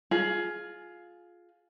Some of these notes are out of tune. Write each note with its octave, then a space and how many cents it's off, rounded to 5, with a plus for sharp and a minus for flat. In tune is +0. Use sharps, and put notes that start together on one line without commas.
F4 +10 G#4 +20